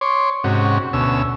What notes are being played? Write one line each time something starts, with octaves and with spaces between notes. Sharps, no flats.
C#5 C6 D6
G#2 C3 C#4 F#4
D2 B2 C#4 E6